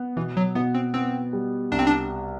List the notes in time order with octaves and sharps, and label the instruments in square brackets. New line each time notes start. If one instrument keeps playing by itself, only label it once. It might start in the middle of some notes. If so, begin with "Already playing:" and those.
Already playing: [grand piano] B3
[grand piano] B2 [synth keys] E3
[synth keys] F#3
[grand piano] B2 [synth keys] B3
[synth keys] C4
[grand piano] B3 [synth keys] C4
[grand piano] G3
[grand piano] C2 [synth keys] D4
[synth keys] C4
D4